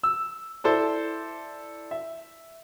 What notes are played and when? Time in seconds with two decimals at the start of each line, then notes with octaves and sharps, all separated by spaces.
0.03 E6
0.64 E4 A4 C5 D5
1.91 E5